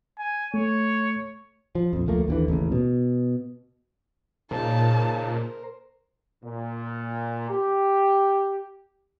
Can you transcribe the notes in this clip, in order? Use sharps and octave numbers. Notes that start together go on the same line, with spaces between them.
G#5
A3 C#5
F3
A#1 F2
D2 F3 A3 A#3
D#2 D3 E3
A1 D#2 C#3
B2
A#2 C#3 D#4 A#4 C5 A5
A#2
G4